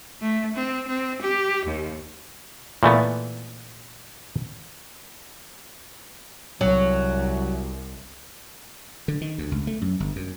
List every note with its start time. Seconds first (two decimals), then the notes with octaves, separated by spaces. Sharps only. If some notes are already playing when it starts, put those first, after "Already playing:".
0.22 A3
0.55 C4
0.88 C4
1.22 G4
1.66 D#2
2.83 A#2 E3 A3 B3
6.61 C2 F#3
9.08 D3
9.21 D#3
9.38 D2
9.52 C#2
9.67 A3
9.81 F#2
10.00 G1
10.16 F#2